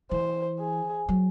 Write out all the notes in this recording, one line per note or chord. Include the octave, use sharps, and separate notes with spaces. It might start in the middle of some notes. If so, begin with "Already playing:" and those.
E3 C5
G#4
F#3